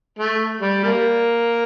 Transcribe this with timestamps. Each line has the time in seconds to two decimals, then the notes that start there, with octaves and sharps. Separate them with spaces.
0.19 A3
0.61 G3
0.84 G3 A#3